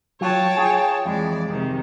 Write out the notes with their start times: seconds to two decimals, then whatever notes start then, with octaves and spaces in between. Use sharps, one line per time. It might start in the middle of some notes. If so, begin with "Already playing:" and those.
0.21 F#3 F4 C#5 G5 A5
0.57 F4 G#4
1.06 F2 E3 G#3 D5
1.46 C3 D#3